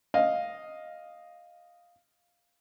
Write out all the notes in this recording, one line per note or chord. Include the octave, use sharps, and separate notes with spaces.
D#5 F5